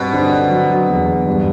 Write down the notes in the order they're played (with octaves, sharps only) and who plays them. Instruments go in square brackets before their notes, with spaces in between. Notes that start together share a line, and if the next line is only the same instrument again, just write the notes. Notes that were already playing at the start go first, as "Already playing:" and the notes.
Already playing: [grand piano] G2 C4 [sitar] B2
[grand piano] D3
F#3
E2
G2